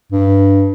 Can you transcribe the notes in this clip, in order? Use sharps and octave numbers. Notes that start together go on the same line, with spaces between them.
G2